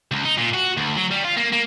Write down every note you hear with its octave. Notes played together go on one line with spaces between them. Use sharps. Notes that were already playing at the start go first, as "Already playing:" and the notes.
C#2
D#4
A#2
F#4
D2
F#3
G3
F4
A#3
A#3